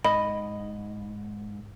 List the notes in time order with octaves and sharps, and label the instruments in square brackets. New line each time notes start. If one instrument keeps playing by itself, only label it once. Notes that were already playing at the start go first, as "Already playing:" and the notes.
[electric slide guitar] G#2 [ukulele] D#5 [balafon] B5